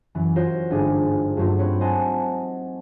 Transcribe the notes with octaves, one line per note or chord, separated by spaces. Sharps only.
F#2 E3 F#3
F4 F#4 A#4 C5 C#5
G1 G#2 D4 G#4
G2 F#3 A3 A#3 F4
C4 B4 C#5
C5 D#5 F#5 G#5 A5